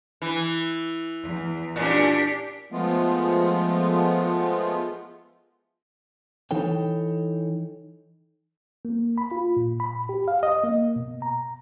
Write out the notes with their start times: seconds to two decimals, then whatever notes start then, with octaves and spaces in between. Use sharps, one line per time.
0.22 E3
1.23 E2
1.76 A#2 D4 G4
2.72 F3 G#3 A3 B3 F4
6.51 E3 D#4 A4 C#5 G5
8.85 A#3
9.18 B5
9.31 F4
9.57 A#2
9.80 B5
10.09 G4
10.28 F5
10.43 D#5
10.64 A#3
10.96 B2
11.22 A#5